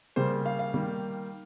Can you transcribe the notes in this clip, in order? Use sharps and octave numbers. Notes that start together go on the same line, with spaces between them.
C#3 G3 A#3 C5
F5
F5
D#3 G3 A#3